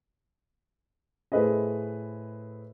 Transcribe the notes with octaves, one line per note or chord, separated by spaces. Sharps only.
A2 G#4 A4 B4 C5 D#5